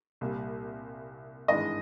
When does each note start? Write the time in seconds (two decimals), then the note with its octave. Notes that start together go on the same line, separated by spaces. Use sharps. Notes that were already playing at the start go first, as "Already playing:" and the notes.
0.21 C2 A#2 G3
1.48 G#1 G2 E3 G#3 D#5